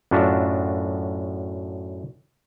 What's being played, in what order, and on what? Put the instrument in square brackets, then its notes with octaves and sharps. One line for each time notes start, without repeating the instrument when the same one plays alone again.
[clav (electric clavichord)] F#2 A2 D4 F4 F#4 E5